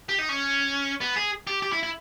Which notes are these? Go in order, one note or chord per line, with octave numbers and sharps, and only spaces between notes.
G4
D#4
C#4
B3
G#4
G4
G4
E4
E4